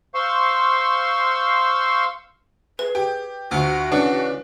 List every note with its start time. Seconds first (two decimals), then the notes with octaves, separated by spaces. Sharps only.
0.14 C5 F5 C6 C#6 E6
2.79 G#4 B4
2.95 G4
3.51 D2 F4 F#4
3.92 C#3 E3 D4